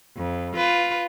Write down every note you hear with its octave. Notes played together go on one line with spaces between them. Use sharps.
F2
F4 B4